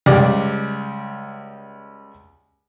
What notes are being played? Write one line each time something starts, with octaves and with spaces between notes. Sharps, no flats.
C#2 G3 D5